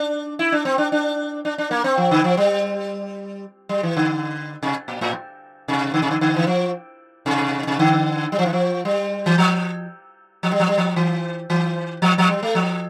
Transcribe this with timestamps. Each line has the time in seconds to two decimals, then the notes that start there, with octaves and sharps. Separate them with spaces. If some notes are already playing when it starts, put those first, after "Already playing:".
Already playing: D4
0.39 E4
0.52 D4
0.65 C4
0.78 D4
0.92 D4
1.45 D4
1.58 D4
1.71 A#3
1.84 C4
1.97 F3
2.11 D3
2.24 F3
2.37 G3
3.69 G3
3.83 E3
3.97 D3
4.63 C3
4.88 A#2
5.01 A2
5.68 C3
5.94 D3
6.02 C3
6.11 D3
6.21 D3
6.36 E3
6.47 F3
7.26 C3
7.67 C3
7.79 D3
8.32 G3
8.39 F3
8.46 E3
8.53 F3
8.85 G3
9.26 E3
9.38 F3
10.43 F3
10.52 G3
10.60 F3
10.68 G3
10.78 F3
10.96 E3
11.50 E3
12.02 F3
12.18 F3
12.29 G3
12.43 A3
12.55 F3